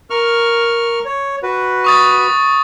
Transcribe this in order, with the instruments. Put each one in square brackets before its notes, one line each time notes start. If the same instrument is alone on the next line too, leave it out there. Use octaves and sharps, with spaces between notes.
[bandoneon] A#4 C#6 F6
C#5
F#4 B4
[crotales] C#6 D#6 A6